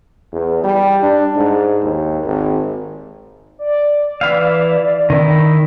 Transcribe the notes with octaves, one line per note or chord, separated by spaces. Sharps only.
E2
G3
D4
G#2
D#2
G#1
D5
E3 E4 F5
D#3 E4